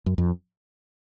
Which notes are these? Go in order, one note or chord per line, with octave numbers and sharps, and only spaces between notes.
F#2
F2